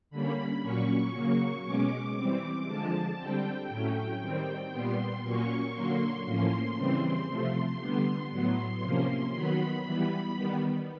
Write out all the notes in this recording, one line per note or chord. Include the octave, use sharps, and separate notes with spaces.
D3 G3 A#3 C#4 B5
A#2 F#3 A#3 C#4 C#6
C#3 F#3 A#3
B2 G#3 C#4 D6
E3 G3 C4
D3 F3 G#3 A5
D3 G3 C4 G5
A2 F#3 A3 C#4
D#3 G3 C4 G5
A#2 G3 B3 C6
A#2 F#3 A#3 C#4 C#6
D3 F#3 A#3 C6
A2 F3 A#3 C#4
C#3 E3 G3 C4
C3 F3 A3 C6
D3 G3 B3
A2 F#3 B3 C6
C3 F3 A#3 C#4
D#3 F#3 B3 B5
E3 G3 B3
D#3 G3 B3